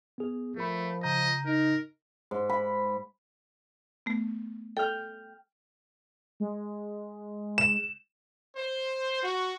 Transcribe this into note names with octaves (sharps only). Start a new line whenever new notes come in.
B3 G#4
F3 A3 A#4 B5
C#3 D#5 A#5 G6
D#4 A#4
G#2
B5
A3 B3
A4 G5 F6
G#3
E7
C5
F#4